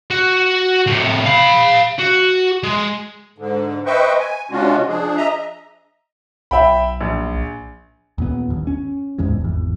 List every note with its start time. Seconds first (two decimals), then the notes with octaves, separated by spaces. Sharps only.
0.11 F#4
0.86 A2 C3
1.26 F5 B5
1.99 F#4
2.63 G#3
3.38 G#2 D3
3.86 B4 C5 D#5 E5 G5 C#6
4.19 G#5
4.51 C3 G#3 C#4 D4 F4 F#4
4.88 F3 D4 G#4
5.16 D#5 E5 A#5
6.51 B1 E5 G5 B5
7.01 A#1
8.18 D#2 A#2 B3
8.50 G1 D#2
8.67 C#4
9.18 D1 G1 E2 G#2
9.41 G#1 E2